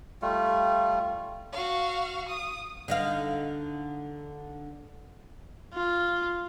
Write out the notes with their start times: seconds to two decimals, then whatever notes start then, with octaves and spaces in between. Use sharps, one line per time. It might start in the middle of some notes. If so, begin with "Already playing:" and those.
0.22 G3 A3 F4
1.53 F#4 F5
2.29 D#6
2.88 D3 D#4 F5
5.74 F4